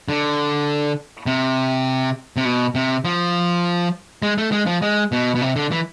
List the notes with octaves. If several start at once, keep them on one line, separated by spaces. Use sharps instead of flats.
D3
C3
C3
B2
C3
F3
G#3
A3
G#3
F3
G#3
B2
B2
C3
D3
E3